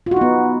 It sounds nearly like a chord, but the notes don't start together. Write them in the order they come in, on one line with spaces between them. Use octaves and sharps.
F4 F#4 D#4 B3